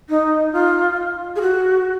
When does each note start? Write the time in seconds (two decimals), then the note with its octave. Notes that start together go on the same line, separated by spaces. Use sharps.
0.09 D#4
0.52 F4
1.36 G#4
1.41 F#4